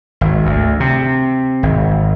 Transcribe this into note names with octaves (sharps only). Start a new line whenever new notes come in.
G#1
D2
C3
G#1